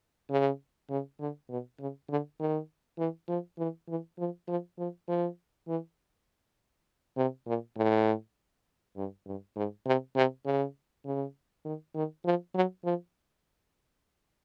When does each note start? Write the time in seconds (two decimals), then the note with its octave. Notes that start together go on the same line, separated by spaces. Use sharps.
0.30 C#3
0.90 C#3
1.20 D3
1.50 B2
1.80 C#3
2.09 D3
2.40 D#3
2.98 E3
3.28 F3
3.58 E3
3.88 E3
4.19 F3
4.48 F3
4.78 F3
5.08 F3
5.68 E3
7.17 C3
7.47 A#2
7.77 A2
8.97 G2
9.26 G2
9.56 G#2
9.86 C3
10.16 C3
10.45 C#3
11.05 C#3
11.65 D#3
11.95 D#3
12.25 F3
12.55 F#3
12.85 F3